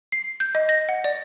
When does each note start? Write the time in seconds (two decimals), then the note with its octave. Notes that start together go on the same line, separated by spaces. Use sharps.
0.12 C7
0.40 G6
0.55 D#5
0.69 A#6
0.89 F#5
1.04 D5